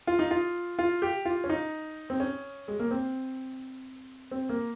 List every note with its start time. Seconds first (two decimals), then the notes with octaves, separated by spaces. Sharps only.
0.07 F4
0.19 D#4
0.31 F4
0.79 F4
1.02 G4
1.25 F4
1.44 C#4
1.50 D#4
2.10 C4
2.20 C#4
2.68 G#3
2.79 A#3
2.91 C4
4.31 C4
4.49 A#3